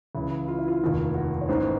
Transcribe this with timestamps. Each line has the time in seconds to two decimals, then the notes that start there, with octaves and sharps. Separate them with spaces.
0.15 C#2 C#3 E3 E4
0.48 F4
0.59 E4
0.68 F4
0.82 F1 D#2 D#3
1.14 F#4
1.41 C#5
1.49 A1 G#2 D#3 C5